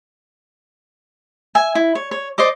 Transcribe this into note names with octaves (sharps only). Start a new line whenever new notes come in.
E5 G#5
E4
C#5
C#5
C5 D5 D#5 D6